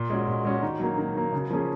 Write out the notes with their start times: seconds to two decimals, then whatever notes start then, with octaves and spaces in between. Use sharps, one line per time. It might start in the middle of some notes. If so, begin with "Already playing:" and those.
Already playing: A#2
0.10 G#3 C#4 F#4
0.28 A#2
0.45 G#3 C#4 F#4
0.62 D#3
0.80 F#3 A#3
0.98 D#3
1.15 F#3 A#3
1.33 C#3
1.51 F3 A#3 C#4 G#4